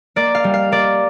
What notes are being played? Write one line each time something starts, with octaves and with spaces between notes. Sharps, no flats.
A#3 D5
F5
G3
F5
A#3 D5